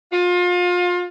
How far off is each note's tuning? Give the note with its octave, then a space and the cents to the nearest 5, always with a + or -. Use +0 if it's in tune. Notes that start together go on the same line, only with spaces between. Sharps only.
F4 +30